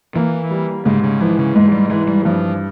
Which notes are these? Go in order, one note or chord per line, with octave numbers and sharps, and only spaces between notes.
E3 A#3
G3
G#2 C#3
C#3
E3 F3
C#3
G#2 G#3
G3
E3 G#3
G3
G2 F3